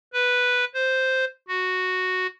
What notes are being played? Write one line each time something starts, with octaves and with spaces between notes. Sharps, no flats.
B4
C5
F#4